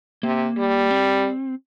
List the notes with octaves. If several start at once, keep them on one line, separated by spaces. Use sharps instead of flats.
C3 A#3
G3
C4